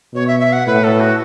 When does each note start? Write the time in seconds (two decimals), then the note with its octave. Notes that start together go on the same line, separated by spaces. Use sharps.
0.14 B2 C#5
0.27 E5
0.40 E5
0.52 F#5
0.66 A2 B4
0.84 A4
1.00 F#4